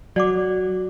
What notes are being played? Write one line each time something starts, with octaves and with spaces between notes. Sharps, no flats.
F#3 F#4 D5 F#5 D6